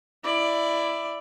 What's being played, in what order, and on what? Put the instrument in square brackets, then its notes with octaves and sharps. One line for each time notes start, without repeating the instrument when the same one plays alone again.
[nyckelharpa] E4 D5